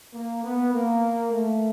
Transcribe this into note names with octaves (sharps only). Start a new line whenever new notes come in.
A#3
B3
A#3
A3